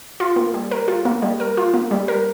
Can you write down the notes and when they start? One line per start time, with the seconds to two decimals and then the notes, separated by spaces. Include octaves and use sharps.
0.20 F4
0.36 A#3
0.54 G3
0.71 A#4
0.88 F4
1.05 A#3
1.22 G3
1.40 A#4
1.57 F4
1.74 A#3
1.91 G3
2.08 A#4